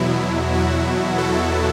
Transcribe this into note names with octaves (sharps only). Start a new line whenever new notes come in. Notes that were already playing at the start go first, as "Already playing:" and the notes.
Already playing: E2 B2 F#3 E4
F#4
A4